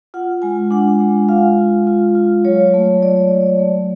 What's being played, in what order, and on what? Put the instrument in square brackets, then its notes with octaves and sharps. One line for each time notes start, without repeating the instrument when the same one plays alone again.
[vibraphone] F4 F#5
G#3 G#5
D4 F#5
G#3
F4 F5
F4
F4
F4
F#3 C#5
A3
F#3 D5
A3
A3